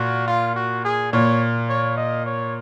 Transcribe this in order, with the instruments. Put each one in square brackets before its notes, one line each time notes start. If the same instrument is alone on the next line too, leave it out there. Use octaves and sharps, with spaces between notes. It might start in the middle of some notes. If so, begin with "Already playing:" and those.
Already playing: [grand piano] A#2 [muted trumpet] F#4
[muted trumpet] F4
F#4
G#4
[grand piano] A#2 [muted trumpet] C#5
[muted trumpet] C#5
D#5
C#5